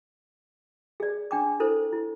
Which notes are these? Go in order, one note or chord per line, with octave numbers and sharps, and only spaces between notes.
G#4 D5
D4 G5 D6
E4 A4 C5
E4